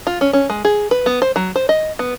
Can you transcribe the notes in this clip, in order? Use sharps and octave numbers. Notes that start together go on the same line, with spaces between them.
F4
C#4
C#4
G#3
G#4
B4
B3
C5
F#3
C5
D#5
B3